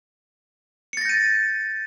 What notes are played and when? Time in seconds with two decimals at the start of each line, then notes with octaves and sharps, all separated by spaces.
0.93 C#7
0.97 A6
1.01 A#6
1.05 G6
1.09 D#7